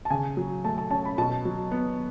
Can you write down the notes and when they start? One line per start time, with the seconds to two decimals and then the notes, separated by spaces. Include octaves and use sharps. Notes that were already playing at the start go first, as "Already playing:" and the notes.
0.05 A5
0.10 C#3 G#5
0.37 F#3
0.64 A3 A5
0.78 A5
0.90 C#4 A5
1.05 B5
1.18 B2 A5
1.45 F#3
1.72 B3